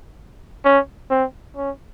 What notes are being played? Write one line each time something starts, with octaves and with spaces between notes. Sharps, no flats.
C#4
C4
C#4